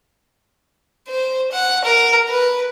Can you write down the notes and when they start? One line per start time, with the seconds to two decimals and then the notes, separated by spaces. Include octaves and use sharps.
1.09 C5
1.52 F#5
1.85 A#4
2.29 B4